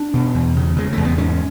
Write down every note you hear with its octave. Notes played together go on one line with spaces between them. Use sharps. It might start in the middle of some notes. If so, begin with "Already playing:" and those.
Already playing: D4
B2
E2
C#3
C#3 G#3
A3
E2
B3
G#2 C#4